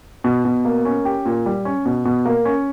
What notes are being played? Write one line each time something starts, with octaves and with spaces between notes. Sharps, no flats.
B2
B2
A#3
C#4
G4
A#2
G3
C#4
B2
B2
A#3
C#4